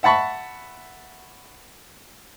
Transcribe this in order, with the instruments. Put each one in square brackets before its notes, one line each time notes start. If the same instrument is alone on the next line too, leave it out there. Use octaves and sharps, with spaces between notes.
[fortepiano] E5 F#5 A5 B5 C#6